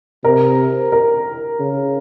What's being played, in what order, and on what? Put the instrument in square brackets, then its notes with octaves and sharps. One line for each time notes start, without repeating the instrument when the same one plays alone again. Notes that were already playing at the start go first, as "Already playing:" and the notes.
[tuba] C3 [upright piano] A#4
[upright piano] A#4
[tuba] C#3